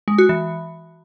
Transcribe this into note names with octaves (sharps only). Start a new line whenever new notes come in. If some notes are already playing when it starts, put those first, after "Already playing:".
G#3
F#4
E3